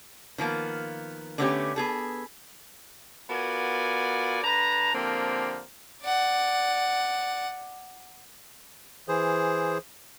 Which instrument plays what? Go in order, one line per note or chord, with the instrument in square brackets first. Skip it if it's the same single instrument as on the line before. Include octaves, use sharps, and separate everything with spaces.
[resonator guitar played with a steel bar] D#3 F3 A#3 B3
D3 A3 B3 C#4 D#4 G4
B3 G#4 A4
[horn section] B3 F4 F#4 A#4 D5 G#5
D3 B4 A5 A#5
D3 F3 A#3 C4 G4 A#4
[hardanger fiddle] D5 F#5
[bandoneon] E3 G#4 C5